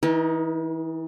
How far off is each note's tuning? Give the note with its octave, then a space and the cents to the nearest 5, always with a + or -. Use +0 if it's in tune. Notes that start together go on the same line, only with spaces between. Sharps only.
E3 -25 D#4 +5 A#4 +40